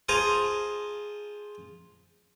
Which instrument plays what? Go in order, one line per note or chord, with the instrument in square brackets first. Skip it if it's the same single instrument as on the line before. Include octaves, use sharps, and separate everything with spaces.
[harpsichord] F4 G#4 C5 A5 A#5